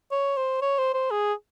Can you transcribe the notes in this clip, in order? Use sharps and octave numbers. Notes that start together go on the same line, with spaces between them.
C#5
C5
C#5
C5
C5
G#4